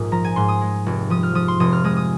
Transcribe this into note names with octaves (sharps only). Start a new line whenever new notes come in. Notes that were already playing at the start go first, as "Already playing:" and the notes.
Already playing: A#1 G#2 D#6
F3 A#5
G#5
G#2 C6
D#6
G#3
F1
F3 D#6
F6
F3 D#6
C6
F1 D#6
F6
G#3 D#6
D#6